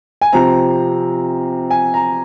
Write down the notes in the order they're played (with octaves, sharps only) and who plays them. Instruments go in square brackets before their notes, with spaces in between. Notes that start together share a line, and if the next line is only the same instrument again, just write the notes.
[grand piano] G#5
C3 F3 C4 A#5
G#5
A#5